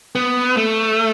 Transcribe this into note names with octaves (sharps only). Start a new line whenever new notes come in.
B3
A3